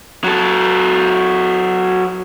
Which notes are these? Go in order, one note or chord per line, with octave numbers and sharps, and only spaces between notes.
F#3 A4